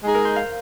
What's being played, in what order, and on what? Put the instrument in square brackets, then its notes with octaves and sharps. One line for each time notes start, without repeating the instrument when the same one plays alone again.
[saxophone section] G#3 D#4 G#4
[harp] A#4
C5
F5